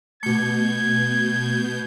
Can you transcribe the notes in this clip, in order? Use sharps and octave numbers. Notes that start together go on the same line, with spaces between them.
B2 A3 G6 G#6